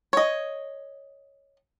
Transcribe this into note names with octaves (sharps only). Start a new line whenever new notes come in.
C#5 D#5